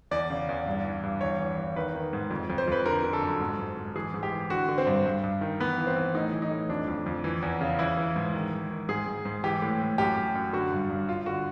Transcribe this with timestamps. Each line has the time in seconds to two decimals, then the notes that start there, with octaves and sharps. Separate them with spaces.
0.11 E2 D5
0.30 C#3
0.49 E2
0.66 G2
0.85 E3
1.03 G2
1.21 E2 C#5
1.40 E3
1.58 E2
1.76 D#3 B4
1.95 D#3
2.13 G#2
2.31 F2
2.50 F2
2.58 C5
2.68 F2 B4
2.86 D3 A#4
3.03 D3
3.13 A4
3.22 F#2
3.40 G#2
3.59 G#2
3.77 G#2
3.95 E3 G#4
4.14 G#2
4.23 G4
4.32 E3
4.50 D3 F#4
4.69 D3
4.78 C4
4.87 G2
5.06 G2
5.24 G2
5.41 D#3
5.60 E3 B3
5.78 E3
5.87 C4
5.96 E3
6.14 A2 D#4
6.33 E3
6.42 D#4
6.51 A2
6.69 F2 D4
6.88 F2
7.06 F2
7.24 E3
7.42 E2
7.61 C#3
7.79 E3 E4
7.97 E3
8.16 G#2
8.34 D#3
8.52 G#2
8.70 D#3
8.89 G#2 G#4
9.07 G#2
9.25 G#2
9.44 E3 G4
9.62 A2
9.80 A2
9.98 F#2 G4
10.17 F#2
10.35 F#2
10.53 D3 F#4
10.72 G2
10.90 G2
11.08 G2 F4
11.26 D3 F#4